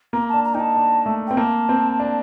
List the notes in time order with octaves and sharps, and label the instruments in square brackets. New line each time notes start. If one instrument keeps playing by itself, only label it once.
[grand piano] A#3 [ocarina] A#5
[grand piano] D4 [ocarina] A5
[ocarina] A#5
[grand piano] D#4 [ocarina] G5
[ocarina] A5
[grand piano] D4
A3
[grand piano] C4 [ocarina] G5
[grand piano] A#3 [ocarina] A5
[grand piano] C4
D4